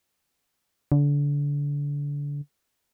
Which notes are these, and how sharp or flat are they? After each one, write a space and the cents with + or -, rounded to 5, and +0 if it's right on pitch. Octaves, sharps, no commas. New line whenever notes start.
D3 -30